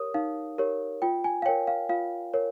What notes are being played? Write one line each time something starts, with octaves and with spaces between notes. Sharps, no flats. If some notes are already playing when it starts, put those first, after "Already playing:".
Already playing: G4 A#4 C#5 D#6
D#4 F5
G4 A#4 C#5
F4 G5
G#5
F5
A#4 C#5 G5
F5
F4 F5
A#4 C#5